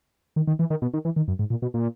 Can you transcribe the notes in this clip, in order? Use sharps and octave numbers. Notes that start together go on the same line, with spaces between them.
D#3
D#3
E3
D#3
B2
D#3
E3
D#3
F#2
G#2
A#2
B2
A#2